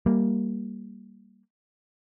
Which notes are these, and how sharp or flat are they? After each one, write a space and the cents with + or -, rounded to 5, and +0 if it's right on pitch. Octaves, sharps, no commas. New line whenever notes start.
G3 +0 A#3 +0